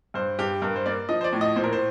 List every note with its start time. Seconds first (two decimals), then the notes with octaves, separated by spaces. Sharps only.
0.14 G2 C5
0.39 G2 G4
0.62 G2 A#4
0.76 C5
0.86 A#3 D5
1.09 F3 D#5
1.21 C5
1.24 D5
1.32 A2
1.41 D#5
1.56 A#2 C5
1.64 A#4
1.73 C5